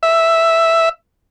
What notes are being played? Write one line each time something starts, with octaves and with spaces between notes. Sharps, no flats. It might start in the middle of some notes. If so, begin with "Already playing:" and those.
E5